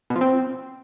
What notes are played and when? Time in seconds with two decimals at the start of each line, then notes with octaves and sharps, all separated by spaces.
0.10 B2
0.16 F3
0.21 C4